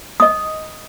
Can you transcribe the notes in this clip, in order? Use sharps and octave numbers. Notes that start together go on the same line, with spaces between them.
D#5 D#6